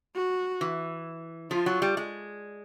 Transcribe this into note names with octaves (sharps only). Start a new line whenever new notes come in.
F#4
E3
F3 F4
F#3
G3
G#3